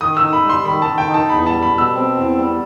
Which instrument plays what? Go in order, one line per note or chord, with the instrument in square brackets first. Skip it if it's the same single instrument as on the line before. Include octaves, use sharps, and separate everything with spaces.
[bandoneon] D#3 [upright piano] D#6
[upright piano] E6
[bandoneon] D#4
[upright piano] B5
[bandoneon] G3
[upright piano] C6
[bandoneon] D#3 [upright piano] B5
[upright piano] A5
[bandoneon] D#3
[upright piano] G5
[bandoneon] D#4
[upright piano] A5
[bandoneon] E2 [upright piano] B5
[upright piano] A5
[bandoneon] G3
[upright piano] B5
[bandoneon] B2
[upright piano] E6
[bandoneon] C4
E2
G3